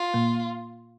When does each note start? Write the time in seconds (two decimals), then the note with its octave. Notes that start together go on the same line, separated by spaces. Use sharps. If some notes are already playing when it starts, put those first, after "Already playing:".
Already playing: F4
0.14 A#2 A#3